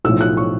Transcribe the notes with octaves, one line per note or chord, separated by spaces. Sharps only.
B1 A2 F3 E6
F#6
C#6